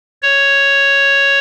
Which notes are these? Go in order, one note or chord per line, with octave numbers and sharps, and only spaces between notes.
C#5